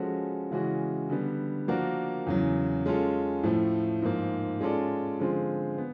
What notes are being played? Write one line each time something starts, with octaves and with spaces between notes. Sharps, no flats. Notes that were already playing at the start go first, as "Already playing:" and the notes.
Already playing: F3 G#3 C#4 F#4 A4
C#3 E3 G#3 C#4 F#4
D3 G3 B3
F3 A#3 D4 F#4 A#4
E2 C#3 F#3
G#3 C#4 F4 A4
A2 F3 A3
G#2 F3 A#3
G#3 C#4 F4 A4 D5
D3 F3 G#3 C4 F4
B3